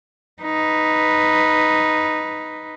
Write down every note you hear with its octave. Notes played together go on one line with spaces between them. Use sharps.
D#4 B4